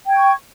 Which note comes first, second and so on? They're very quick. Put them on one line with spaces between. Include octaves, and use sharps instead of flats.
G5 G#6 C#6